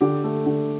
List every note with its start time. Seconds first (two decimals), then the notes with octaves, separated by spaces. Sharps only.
0.01 D3 G4
0.24 A3
0.46 D3